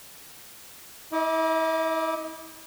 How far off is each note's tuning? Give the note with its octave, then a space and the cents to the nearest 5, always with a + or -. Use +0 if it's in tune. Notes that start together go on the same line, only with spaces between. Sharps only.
E4 -35 D#5 +15 D6 +0